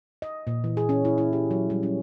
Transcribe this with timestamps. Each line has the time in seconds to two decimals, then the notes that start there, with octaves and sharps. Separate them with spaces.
0.22 D#5
0.47 A#2
0.64 E3
0.77 G#4
0.89 C#4
1.05 E4
1.18 E4
1.33 G4
1.51 F#3
1.70 G3
1.83 C#4